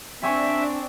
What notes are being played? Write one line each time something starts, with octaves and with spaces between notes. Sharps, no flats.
C4 D4 E5 G5 G#5 C#6